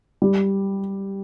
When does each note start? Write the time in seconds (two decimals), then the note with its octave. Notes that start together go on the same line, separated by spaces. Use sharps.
0.22 G3